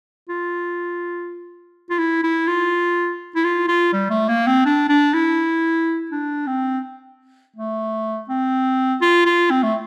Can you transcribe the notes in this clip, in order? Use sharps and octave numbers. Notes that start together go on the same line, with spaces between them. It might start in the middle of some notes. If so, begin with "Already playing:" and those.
F4
F4
E4
E4
F4
E4
F4
F4
G3
A3
A#3
C4
D4
D4
E4
D4
C4
A3
C4
F4
F4
C4
A3